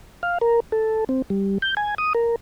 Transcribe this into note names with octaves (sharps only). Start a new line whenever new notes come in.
F5
A#4
A4
C4
G3
G6
G#5
D#6
A#4